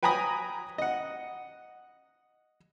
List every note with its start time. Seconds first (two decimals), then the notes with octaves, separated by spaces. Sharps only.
0.03 B4 G5 G#5 A#5 B5 D#6
0.78 D#5 F#5